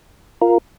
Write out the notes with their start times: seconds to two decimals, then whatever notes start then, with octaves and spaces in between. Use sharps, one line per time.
0.41 F4 A#4